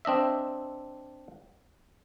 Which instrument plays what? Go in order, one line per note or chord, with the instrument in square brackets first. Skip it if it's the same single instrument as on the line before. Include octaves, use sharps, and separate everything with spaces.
[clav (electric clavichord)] C4 D4 D#5 E5